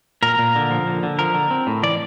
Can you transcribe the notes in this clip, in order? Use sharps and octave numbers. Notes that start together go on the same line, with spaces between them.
A#2 A#4
A#2
D3
F3
D3
D3
F3 A#4
D3
C4
A2
E3 D5